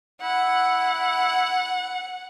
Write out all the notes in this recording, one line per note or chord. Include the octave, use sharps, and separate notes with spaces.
E4 F#5